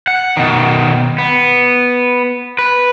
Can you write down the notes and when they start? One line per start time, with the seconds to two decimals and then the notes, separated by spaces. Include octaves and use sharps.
0.07 F#5
0.37 B2 D#3
1.18 B3
2.59 B4